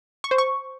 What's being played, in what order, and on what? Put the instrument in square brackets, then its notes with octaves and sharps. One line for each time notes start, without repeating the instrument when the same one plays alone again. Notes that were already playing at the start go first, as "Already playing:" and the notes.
[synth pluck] C#6
C5
C#6